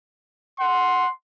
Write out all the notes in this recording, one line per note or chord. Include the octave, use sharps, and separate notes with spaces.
F#5 C6